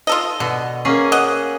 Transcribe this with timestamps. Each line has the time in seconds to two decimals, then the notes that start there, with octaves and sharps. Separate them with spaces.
0.07 F4 A4 D#5
0.40 B2 D3
0.85 A#3 C#4 G#4
1.12 D#5 F#5